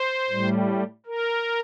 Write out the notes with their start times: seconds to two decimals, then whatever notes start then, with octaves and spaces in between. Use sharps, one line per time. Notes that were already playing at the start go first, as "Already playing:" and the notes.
Already playing: C5
0.29 A2 G3
1.06 A#4